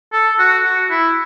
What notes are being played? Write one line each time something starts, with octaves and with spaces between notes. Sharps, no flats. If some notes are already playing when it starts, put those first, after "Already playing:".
A4
F#4
F#4
E4